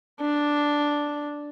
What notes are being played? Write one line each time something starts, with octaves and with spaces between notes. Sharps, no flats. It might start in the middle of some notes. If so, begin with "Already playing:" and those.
D4